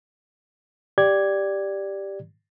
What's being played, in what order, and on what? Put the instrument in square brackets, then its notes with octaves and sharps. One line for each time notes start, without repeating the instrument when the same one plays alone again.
[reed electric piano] G4 D5 G#6